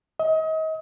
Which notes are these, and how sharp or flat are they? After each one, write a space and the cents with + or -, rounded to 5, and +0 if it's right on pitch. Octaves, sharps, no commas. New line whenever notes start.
D#5 +35